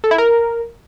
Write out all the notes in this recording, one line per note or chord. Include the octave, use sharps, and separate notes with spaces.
A4
E4
A#4